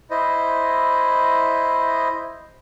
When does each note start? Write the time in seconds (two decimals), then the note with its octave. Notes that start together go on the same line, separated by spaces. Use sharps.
0.11 E4 C5 D#5